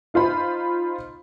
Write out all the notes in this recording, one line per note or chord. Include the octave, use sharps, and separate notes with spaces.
D#4 F4 C5 B5